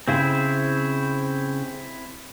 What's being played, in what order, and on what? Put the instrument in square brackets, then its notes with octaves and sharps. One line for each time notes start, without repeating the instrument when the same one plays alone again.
[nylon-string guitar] C#3 [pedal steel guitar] C4 E4 C5